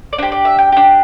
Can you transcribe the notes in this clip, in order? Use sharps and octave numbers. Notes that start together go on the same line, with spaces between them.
D5
D4 G4 C5
D5
E5
G5
D4 G4